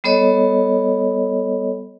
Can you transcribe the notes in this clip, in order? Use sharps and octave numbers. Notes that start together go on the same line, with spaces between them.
G3 B3 A4 C#5 D#5